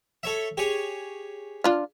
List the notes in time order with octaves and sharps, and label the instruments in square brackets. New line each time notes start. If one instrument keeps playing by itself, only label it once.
[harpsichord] A4 C#5 E5
G4 G#4 C#5
[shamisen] D4 F4 F5